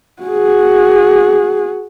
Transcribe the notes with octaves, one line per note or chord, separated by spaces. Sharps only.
F#4 G#4